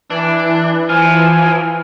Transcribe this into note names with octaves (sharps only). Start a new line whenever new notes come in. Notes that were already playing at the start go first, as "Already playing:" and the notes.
E3 D4
F3 G#5 F6